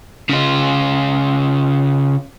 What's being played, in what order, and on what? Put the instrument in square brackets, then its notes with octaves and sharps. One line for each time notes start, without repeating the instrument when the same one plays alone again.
[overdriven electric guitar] C#3 F4